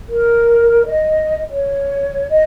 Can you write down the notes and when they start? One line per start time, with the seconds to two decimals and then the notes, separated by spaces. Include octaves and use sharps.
0.07 A#4
0.86 D#5
1.50 C#5
2.30 D#5